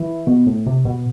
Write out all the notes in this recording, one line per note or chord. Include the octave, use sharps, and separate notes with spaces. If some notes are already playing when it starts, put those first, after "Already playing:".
Already playing: E3
B2
A2
C3
B2